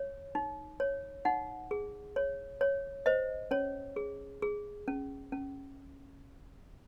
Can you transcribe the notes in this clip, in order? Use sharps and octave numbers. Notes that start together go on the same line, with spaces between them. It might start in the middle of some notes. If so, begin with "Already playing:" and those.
Already playing: C#5
D#4
C#5
D#4 F#5
G#4
C#5
C#5
C5 D#5
C#4 C#5
G#4
G#4
C#4
C#4